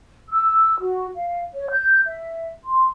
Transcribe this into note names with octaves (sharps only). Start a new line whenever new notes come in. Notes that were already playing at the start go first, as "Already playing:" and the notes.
E6
F#4
F5
C#5
G6
E5
C6